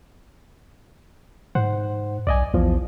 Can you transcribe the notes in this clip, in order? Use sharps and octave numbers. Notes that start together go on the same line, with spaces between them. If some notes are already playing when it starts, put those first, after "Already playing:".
G#2 C5 F#5
B1 D5 D#5 G#5
A#1 E2 F3